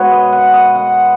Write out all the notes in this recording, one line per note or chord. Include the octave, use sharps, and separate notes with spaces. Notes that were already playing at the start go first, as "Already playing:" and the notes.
Already playing: B2 G#3 B4 C#5 F#5
D#5
F#5
D#5
F#5